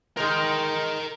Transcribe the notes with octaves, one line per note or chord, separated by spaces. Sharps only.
G#2 D#3 G#3 A#4 G5